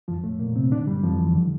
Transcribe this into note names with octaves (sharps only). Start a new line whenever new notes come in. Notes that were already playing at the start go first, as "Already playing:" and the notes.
F2 F3
A2 A3
A#2 A#3
C3 C4
D3 D4
G2 G3
F2 F3
E2 E3
D3